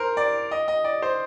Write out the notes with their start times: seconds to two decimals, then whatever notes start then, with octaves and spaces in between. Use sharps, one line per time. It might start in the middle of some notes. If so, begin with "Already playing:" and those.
Already playing: A#4 C5
0.17 D5
0.51 D#5
0.68 D#5
0.84 D5
1.02 C5